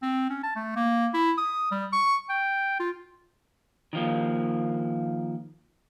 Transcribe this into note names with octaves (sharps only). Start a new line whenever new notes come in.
C4
C#4
A5
A3
A#3
E4
D#6
G3
C#6
G5
F4
D#3 F3 A#3